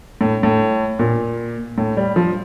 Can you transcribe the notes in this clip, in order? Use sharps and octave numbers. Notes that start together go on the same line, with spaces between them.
A2
A2
A#2
A2
G3
F3